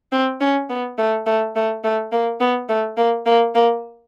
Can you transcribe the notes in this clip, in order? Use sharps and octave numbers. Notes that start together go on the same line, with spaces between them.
C4
C#4
B3
A3
A3
A3
A3
A#3
B3
A3
A#3
A#3
A#3